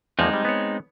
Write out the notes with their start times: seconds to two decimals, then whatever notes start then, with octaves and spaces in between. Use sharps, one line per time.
0.19 E2 F3 G#3 A#3 C4 D#4
0.33 G3
0.45 B3 C#5